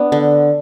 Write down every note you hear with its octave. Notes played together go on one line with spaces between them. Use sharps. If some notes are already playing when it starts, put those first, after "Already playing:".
Already playing: B3 D4
D3